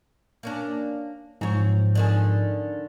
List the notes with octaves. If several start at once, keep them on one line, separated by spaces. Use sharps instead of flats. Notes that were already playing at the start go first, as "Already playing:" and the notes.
A#3 C#4 D4
G#2 F3 C4 C#5
D3 D#3 G#4